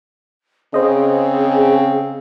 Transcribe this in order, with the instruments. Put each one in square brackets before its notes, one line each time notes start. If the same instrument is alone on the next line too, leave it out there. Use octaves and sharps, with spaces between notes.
[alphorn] C#3 [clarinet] C4 [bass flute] G#4 [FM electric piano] C5 D#5